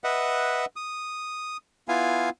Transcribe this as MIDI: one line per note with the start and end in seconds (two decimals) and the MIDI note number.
0.04 0.65 71
0.04 0.65 75
0.04 0.65 76
0.04 0.65 78
0.76 1.57 87
1.88 2.30 59
1.88 2.30 64
1.88 2.30 65
1.88 2.30 77
1.88 2.30 80